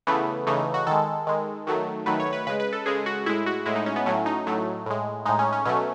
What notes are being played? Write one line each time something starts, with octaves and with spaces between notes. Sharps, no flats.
C#3 E3 A3 B3
C#3 E3 A3 D#4
F#4
D#3 G#3 A4
D#3 G#3
D#3 F#3 A3
D#3 F#3 A3 B4
C#5
B4
C#3 G#3 B4
B4
A4
C#3 G#3 G#4
F#4
A2 G#3 E4
F#4
A2 G#3 E4
D#4
C#4
B3
A2 F#3 A3 C#4
D#4
A2 F#3 A3
A2 G#3
A2 G#3 D#4
C#4
C#4
B2 F#3 A3 C#4